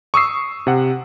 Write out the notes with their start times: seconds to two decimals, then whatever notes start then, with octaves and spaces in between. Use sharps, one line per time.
0.14 C#6 D#6 E6 C7
0.67 C3 F#5